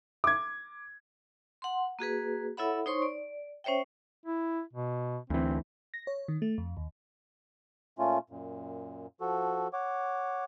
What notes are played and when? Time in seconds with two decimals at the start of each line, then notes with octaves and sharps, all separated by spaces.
0.24 D6 G#6
1.62 F#5 C6
1.99 A#3 F#4 G#4 B4
2.57 E4 A4 C#5 E5 F#5 B5
2.86 D#4 C5 C#5 C6 C#6
3.02 D5
3.64 C#4 C5 C#5 E5 G5
4.26 E4
4.73 B2
5.30 D2 E3 C4
5.94 A#6
6.07 C#5
6.28 D#3
6.42 A3
6.58 F2
6.77 D#2
7.99 A#2 A3 C#4 F4
8.30 F#2 A#2
9.21 F3 F#4 A4
9.73 C#5 F#5 D6